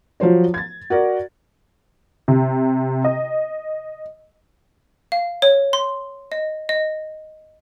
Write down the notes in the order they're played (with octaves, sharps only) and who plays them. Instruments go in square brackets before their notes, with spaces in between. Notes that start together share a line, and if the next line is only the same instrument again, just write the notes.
[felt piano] F3 F#3 C5 C#5
G#6 A6
F#4 A#4 D5
[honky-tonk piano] C3
D#5
[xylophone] F5
C#5
C6
D#5
D#5